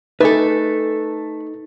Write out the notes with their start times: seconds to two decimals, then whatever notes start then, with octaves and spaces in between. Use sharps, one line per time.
0.21 A3 D#4 A4 B4 G#5